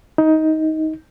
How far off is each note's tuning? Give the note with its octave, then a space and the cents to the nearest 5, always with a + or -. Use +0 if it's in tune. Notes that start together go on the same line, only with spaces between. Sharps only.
D#4 +15